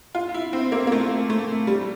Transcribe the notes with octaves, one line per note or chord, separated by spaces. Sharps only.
F4
E4
C4
A#3
A#3
A3
A3
G3